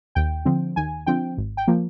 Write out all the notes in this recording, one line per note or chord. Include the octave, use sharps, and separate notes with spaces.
D#2 G5
D3 F3 C4
D#2 G#5
D3 F3 C4 G5
G#1
G5
F3 A#3